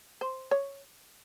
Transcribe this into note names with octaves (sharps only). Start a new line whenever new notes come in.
C5
C#5